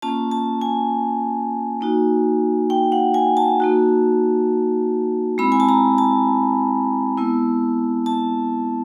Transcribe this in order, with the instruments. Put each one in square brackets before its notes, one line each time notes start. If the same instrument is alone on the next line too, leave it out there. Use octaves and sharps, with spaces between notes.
[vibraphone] A#3 C#4 F4 A5
A5
G#5
A#3 D#4 F#4
G5
F#5
G#5
A5
A#3 D#4 F#4
G#3 C4 E4 B5
G#5
A5
A#5
A5
G#3 B3 E4
A5